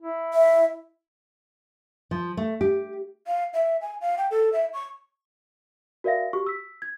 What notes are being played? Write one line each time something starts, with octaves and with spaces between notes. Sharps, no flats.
E4
E5
F3
A3
G4
F5
E5
G#5
F5
G5
A4
E5
C#6
F#4 A#4 D5 E5 F5 A#6
F#4 G4 C#6
E6 B6
G#6